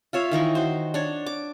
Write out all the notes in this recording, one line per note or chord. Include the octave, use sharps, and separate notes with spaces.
F4 C#5 E5 F5
D#3 E3 D#4 C#6
F#4 C5
D4 C#5
D6